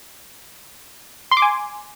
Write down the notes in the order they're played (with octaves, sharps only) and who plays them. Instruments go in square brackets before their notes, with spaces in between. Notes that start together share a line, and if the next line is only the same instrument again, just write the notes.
[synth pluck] C6
D6
G#5